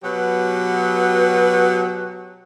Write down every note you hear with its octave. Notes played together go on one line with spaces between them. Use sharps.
B2 F#3 G4 B4